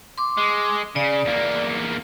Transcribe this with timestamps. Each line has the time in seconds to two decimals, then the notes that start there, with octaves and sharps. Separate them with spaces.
0.18 C6 D6
0.38 G#3
0.96 C#3 D5
1.25 E2 A#3